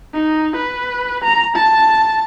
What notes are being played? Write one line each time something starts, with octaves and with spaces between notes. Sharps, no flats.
D#4
B4
A#5
A5